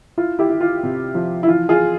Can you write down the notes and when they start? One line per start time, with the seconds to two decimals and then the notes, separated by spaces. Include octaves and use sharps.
0.18 E4 F4
0.39 E4 G4
0.50 E4
0.61 F4
0.83 C3
1.15 F3
1.43 E4
1.47 E3 F4
1.69 F4 G#4